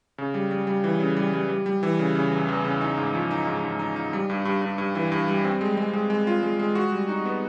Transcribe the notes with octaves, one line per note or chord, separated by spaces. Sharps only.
C#3
G3
G3
G3
E3
C#3
G3
G3
G3
G3
E3
C#3
C#3
E2
E2
C#3
D#4
G#2
F3
D#4
G#2
G#2
D#4
D#4
G3
G2
G2
G2
G2
E3
G2
G3
C4
G#3
G#3
G#3
G#3
F4
G#3
G#3
F#4
G3
D#4
B3